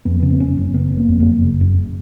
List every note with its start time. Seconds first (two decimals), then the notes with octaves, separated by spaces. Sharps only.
0.05 F2 B3
0.20 C#3 B3
0.30 C4
0.39 F#1 C#4
0.57 F#1
0.74 C#3 B3
0.92 F#1 A#3
1.09 F2
1.20 A#3
1.26 F#1
1.44 C#3
1.61 F#2